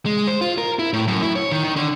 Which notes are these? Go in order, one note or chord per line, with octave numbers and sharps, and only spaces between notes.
G#3
C5
F4
A#4
E4
A2
F#2
E4
C#5
D#3
D#3
D3